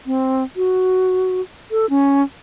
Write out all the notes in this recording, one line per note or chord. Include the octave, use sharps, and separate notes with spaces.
C4
F#4
A4
C#4